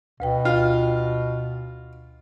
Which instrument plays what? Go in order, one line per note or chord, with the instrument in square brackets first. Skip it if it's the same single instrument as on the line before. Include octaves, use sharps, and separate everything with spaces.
[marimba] D2 B4 G5 [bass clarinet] B2
[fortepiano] F4